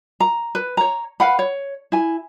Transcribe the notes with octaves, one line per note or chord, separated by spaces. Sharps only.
A#5
B4
C#5 A#5
B4 F5 F#5 B5
C#5
E4 G#5